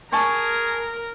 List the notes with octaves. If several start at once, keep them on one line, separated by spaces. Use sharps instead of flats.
G#4 A#4 G#5 A5 C#6